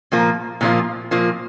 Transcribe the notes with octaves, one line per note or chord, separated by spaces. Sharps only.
A#2 F3 A#3 F4
A#2 F3 A#3 F4
A#2 F3 A#3 F4